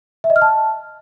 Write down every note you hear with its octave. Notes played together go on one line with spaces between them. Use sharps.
E5
D#5
F6
A5